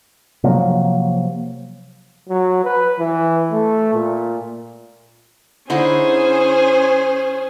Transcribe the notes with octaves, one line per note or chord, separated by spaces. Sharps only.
C3 F3 F#3 A#3
F#3
B4
E3
A3
A#2
D3 C#4 D#4 E4 G#4 C5